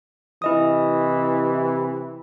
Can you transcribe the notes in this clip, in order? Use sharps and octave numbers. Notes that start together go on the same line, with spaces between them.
C3 E3 E4 D#5 D#6